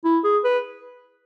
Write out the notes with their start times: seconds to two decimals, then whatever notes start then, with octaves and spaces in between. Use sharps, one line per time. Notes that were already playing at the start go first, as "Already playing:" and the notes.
0.04 E4
0.24 G#4
0.45 B4